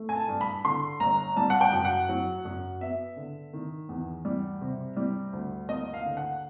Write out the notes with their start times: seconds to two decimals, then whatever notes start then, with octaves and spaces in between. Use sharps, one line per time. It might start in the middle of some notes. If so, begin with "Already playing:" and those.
Already playing: A3
0.09 G#5
0.16 A5
0.28 G2
0.41 B5
0.65 D3 C6
1.00 G1 A#5
1.37 G3 A5
1.50 F#5
1.61 G5
1.72 F#2
1.85 F#5
2.09 F#3
2.45 F#2
2.81 B3 E5
3.16 D3
3.53 D#3
3.89 E2
4.25 G3
4.61 C3
4.97 G3
5.33 D2
5.69 A#3 D#5
5.94 F5
6.05 D3
6.17 F#5